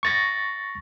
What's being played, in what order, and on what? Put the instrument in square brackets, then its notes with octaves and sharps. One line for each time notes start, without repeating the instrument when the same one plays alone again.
[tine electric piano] C#6 A6 A#6